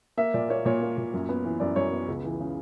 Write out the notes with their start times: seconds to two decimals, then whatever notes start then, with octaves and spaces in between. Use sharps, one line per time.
0.17 A#3 E5
0.34 A#2 D5
0.49 A#3 C#5
0.65 A#2 C#5
0.82 A#3
0.98 A#2
1.14 F#2
1.29 B3
1.44 E3
1.60 F#2 D5
1.76 F#2 C#5
1.92 B3
2.08 C#2
2.24 E3
2.40 C#3